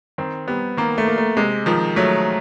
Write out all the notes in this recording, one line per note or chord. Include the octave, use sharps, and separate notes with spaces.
D#3 C4
G3 B3
D#3 A#3
A3
A#3
A3
C3 G#3
D#3 F3
F#3 A3